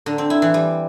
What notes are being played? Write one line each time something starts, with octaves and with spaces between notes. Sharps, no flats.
D3
C4
E4
E3
G3